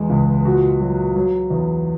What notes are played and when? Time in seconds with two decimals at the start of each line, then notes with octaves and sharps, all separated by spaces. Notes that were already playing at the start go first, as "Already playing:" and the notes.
Already playing: E2 G#3
0.10 C#2
0.45 A#2 F#4
0.80 F#3
1.15 F#3
1.50 E2